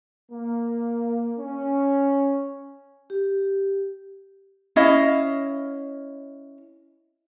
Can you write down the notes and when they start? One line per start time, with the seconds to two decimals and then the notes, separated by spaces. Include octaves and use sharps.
0.31 A#3
1.38 C#4
3.10 G4
4.76 C#4 E4 D#5 F5